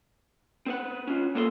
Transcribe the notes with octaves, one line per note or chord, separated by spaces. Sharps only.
C4 B4 F#5
C#4 F4
C2 A#3 B3 A4 A5 C6